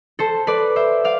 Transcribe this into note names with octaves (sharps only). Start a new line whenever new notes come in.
A4 C5
B4 D5
C5 E5
D5 F5